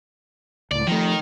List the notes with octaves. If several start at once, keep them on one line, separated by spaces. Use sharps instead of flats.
C#2 A2 D5
D#3 F3 A3